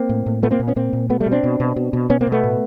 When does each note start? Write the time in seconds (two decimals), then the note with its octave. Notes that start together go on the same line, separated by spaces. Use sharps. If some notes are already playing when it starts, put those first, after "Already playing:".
Already playing: A#3 C4
0.09 A2
0.26 A2
0.43 A#2 A3 B3
0.51 A#3 C4
0.60 A#2
0.68 B3 C#4
0.76 A#2 A#3 C4
0.93 A#2
1.10 B2 A3 B3
1.20 G3 A3
1.26 B2
1.31 C4 D4
1.43 B2
1.60 B2
1.76 B2
1.93 B2
2.10 B2 B3 C#4
2.21 A#3 C4
2.27 B2
2.32 A3 B3
2.43 A2